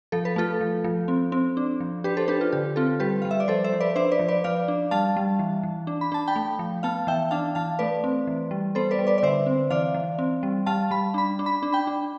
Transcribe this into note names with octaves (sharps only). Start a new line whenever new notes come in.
F3 A4
B4
A3 F4 A4
F3
F3
C4
C4
D4
F3
D4 G4 B4
A4 C5
D4 G4 B4
F4
D3 G4
C4 F4 A4
G3 G4 B4
G3 F5
E5
D5
F3 A4 C5
C5 E5
F3
B4 D5
D4 C5 E5
B4 D5
F3
B4 D5
F3 D5 F5
D4
G3 F5 A5
G3
E3
E3
D4
B5
D4 A5
G5 B5
A3
F3
B3 F5 A5
E3 E5 G5
D4 F5 A5
E3 F5 A5
A3 B4 D5
C4
E3
G3
B3 A4 C5
B4 D5
G3
B4 D5
D5
D3 C5 E5
C4
E3 D5 F5
E3
C4
G3
G3 F5 A5
G3 B5
D4 B5
D4
B5
D4
G5 B5
D4